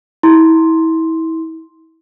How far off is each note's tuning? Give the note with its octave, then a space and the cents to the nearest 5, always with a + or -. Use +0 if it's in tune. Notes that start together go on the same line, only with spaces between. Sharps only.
E4 -30 C6 +0